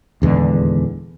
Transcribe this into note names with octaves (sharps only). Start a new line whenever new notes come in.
D#1 E2 D3 G#3